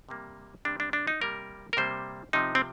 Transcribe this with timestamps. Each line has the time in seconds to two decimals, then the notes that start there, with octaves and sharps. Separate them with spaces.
0.09 C3 G3 A#3
0.65 C3 G3 A#3 D4
0.80 D4
0.93 D4
1.07 D#4
1.22 C3 G3 A#3 A#4
1.73 A#4
1.77 C3 G3 A#3 C5
2.33 C3 F3 C4 D#4
2.55 C4